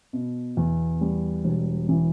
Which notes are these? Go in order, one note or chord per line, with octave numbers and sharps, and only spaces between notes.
B2
E2
G3
E1
E3